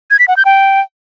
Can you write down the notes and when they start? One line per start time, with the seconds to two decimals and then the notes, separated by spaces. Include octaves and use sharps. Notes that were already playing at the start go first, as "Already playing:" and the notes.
0.11 G#6
0.19 B6
0.28 F#5
0.37 G6
0.45 G5